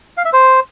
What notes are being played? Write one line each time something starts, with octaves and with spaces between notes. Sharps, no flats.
F5
E5
C5